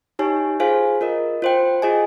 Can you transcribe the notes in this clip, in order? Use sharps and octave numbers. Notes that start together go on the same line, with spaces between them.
D#4 G4 C#5 G#5
F4 G#4 C5 F5 G#5
F4 A#4 D#5
F4 C5 G5
F4 G#4 D#5 G#5